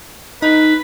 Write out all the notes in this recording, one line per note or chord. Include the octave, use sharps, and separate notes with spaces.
D#4 B4